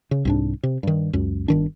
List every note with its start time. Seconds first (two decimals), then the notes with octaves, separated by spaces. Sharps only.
0.11 C#3
0.25 C2 G#2 D4
0.63 C3
0.83 G2 D#3
1.13 C#2 F#2
1.48 G1 D#3 D4